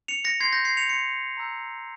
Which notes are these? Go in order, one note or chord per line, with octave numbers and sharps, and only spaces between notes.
C#7 F7
A#6 C#7
C6 G6 G#6 C7
G6 A#6
G#6 C7
C#7 F7
C6 G6 C#7 F7
A#5 E6 G6